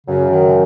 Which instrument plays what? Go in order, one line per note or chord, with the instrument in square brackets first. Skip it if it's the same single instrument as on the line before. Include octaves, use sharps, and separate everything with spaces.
[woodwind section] F#2 [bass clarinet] C#3
[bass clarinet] D#3